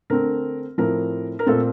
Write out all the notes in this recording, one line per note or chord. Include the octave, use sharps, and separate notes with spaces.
D3 A3 C4 A#4
A2 F3 C4 A#4
A#4
A#2 A3 C4 A4